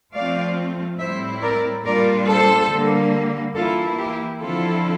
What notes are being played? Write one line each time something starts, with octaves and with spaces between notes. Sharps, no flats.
F3 A3 C4 F4 D5 F5
A2 G3 C4 E4 C5 E5
A#4 D5
A#2 G3 D4 F4 A#4 D5
A4 C5
D3 G3 A#3
E3 A#3 E4 F4 A4
G4
D3 F3 C4 E4 F4 A4